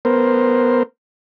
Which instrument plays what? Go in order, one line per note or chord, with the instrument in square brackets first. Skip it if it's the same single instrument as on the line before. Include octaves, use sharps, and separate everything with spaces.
[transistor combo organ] B3 A#4 C5